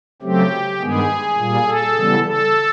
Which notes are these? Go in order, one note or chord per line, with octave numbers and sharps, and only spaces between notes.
C#3 F#3 A3 C4 G4
G2 D#3 G#3 B3 G#4
A#2 G3 A#3
A4
C#3 E3 G3 B3
A4